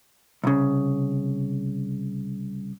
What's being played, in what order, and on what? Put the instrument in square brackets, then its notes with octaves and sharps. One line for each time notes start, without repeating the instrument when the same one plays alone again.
[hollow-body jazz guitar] C2 C#3